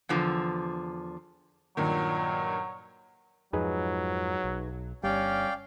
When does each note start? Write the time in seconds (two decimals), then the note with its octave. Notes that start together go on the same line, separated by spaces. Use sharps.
0.09 E2 D3 F3
1.77 G2 A#2 D#3 F#3
3.53 F2 G#2 F3 F#3 D#4 G#4 B4
4.44 B1
5.04 G1 G3 C#4 D5 F5 G5